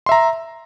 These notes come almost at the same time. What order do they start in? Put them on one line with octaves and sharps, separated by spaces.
C6 E5 A#5